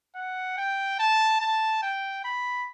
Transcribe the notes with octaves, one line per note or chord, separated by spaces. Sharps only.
F#5
G5
A5
A5
G5
B5